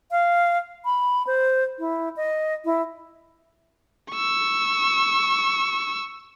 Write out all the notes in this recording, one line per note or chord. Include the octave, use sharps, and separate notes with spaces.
F5
B5
C5
E4
D#5
E4
C#6 E6